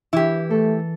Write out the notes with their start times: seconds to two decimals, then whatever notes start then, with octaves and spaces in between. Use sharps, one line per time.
0.13 E3 E4 G4
0.50 A3 A4